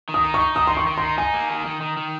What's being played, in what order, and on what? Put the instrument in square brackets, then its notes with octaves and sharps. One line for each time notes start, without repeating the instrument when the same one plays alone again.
[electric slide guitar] D#3
[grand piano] D#6
[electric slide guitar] D#4
[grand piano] C#6
[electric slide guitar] D#4
[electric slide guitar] D#3 [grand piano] D#6
[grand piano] C6
[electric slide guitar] D#3
[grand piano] C#6
[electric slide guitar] D#3
[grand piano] C6
[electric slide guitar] D#4
[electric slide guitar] D#4 [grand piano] G#5
[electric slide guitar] A#3
D#3
D#3
D#3
D#3